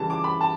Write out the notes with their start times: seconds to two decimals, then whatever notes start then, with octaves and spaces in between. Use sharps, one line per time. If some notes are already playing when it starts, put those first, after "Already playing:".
Already playing: C#3 E3 G3 A5
0.10 D6
0.24 B5
0.41 A5